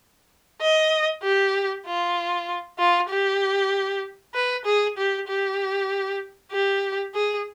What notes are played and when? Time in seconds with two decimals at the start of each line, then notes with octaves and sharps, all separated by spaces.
0.61 D#5
1.23 G4
1.86 F4
2.79 F4
3.10 G4
4.34 B4
4.65 G#4
4.97 G4
5.27 G4
6.52 G4
7.15 G#4